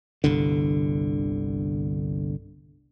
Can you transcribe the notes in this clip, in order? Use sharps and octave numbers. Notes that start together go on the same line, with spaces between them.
G1 C2 D3